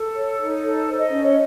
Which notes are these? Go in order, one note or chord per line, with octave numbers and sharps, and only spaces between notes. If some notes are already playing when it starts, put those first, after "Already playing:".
Already playing: A4
C#5
D#4
A4
C5
D#5
C#4
C#5